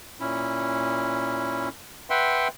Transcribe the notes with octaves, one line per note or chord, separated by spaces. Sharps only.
A#2 C#4 E4
B4 E5 F#5 G5 C6